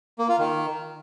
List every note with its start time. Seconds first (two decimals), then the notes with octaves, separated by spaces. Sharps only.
0.19 A#3
0.29 F4
0.38 D#3